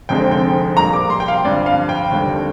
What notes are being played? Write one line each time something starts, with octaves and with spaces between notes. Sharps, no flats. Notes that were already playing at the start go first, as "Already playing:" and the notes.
F1 F2 D3 G#3 C4 G5
G5
A#1 A#2 G3 A#3 A#5
D6
C6
G5
F5
G1 G2 F3 C4 D5
F5
G5
D#2 D3 G3 C4